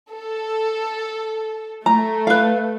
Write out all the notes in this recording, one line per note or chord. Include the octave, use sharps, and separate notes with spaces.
A4
A3 A#5
B4 F5